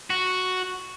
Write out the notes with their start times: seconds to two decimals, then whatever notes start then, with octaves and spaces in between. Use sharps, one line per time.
0.10 F#4